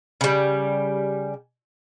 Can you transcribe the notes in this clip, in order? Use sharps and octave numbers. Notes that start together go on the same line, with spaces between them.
C#3 G3